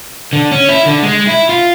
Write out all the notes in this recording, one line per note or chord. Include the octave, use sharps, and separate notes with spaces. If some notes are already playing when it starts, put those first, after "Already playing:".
D3
C#4
E4
D3
G#3
E4
F4